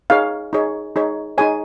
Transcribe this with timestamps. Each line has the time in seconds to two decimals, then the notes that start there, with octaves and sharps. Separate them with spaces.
0.10 D#4 G#4 C#5 F5
0.53 D#4 G#4 C#5
0.96 D#4 G#4 C#5
1.38 D#4 G#4 C#5 G#5